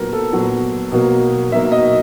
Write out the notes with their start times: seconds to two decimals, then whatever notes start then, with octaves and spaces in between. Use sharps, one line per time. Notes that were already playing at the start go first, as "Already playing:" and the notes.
Already playing: A#2 F#3 B3 A#4
0.13 A4
0.33 A#2 F#3 B3
0.92 B2 F#3 A#3
1.52 B2 F#3 A#3 E5
1.72 D#5